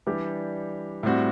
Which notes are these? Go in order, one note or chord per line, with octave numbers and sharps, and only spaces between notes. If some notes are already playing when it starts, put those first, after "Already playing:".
E3 G3 D4 G4
A2 G3 C4 F#4